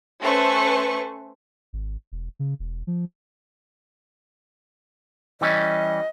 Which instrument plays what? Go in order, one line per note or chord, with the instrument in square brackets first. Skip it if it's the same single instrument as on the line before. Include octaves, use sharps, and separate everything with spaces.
[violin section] A3 C#4 B4 C5 C#6
[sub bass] G#1
E1
C#3
E1
F3
[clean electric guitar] E3 G3 C#4 [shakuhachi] D#5